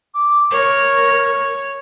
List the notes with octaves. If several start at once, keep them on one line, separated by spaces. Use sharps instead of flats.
D6
A#4 C#5